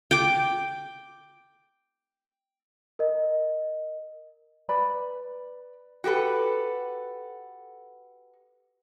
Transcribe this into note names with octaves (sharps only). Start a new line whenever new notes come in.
G5 D6
A#4 D#5
B4 D5 B5
F#4 G4 A4 B4